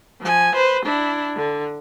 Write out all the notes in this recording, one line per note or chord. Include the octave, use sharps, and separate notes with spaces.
F3 G#5
B4 C5
D4 E4
D3